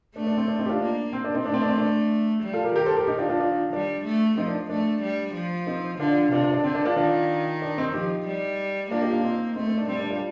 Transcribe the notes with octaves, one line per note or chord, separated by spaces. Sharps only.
A3 D4
D4
C4
D4
C4 D#4
G4
D4 F4
A#3 D4
C4
D4
C4 D#4
A3 D4
C4
D4
C4
D4
G3
F4 A4
G4 A#4
D#3 G4 A#4
A4 C5
G4 A#4
D#4 G4
D4 F4
D4 F4
D4 F4
G3 D4
A3
F3 C4 D#4
D4
A3 D4
G3
F3
C4 D#4
D3 D4 F4
C3 D4 F4
D4
D4
D3 C4
D4
D4 F4
D#3 D4 F4
D4
C4 D#4
F3 D#4 G4
G3
A#3 D4 F4
D#4 G4
D4 F4
C4 D#4
A3 C4 D#4
C4 D#4
D4
G3 C4
D4
D4 F4